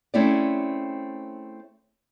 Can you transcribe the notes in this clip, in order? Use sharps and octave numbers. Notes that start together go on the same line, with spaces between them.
A3 C4 C#4 E4 G#4 D5